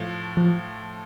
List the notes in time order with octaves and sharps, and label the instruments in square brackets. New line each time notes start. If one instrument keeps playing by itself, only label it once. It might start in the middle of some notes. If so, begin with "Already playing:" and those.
Already playing: [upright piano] A2 F3 A3
[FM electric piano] F3